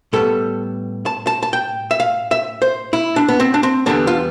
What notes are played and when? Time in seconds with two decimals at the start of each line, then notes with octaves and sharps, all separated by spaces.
0.13 A2 G3 B3 A4
1.06 A5
1.27 A5
1.43 A5
1.53 G5
1.91 E5
2.00 F5
2.31 E5
2.62 C5
2.93 E4
3.16 D4
3.28 B3
3.40 C4
3.54 D4
3.63 C4
3.86 E2 D3 G3 B3 D4
4.07 F4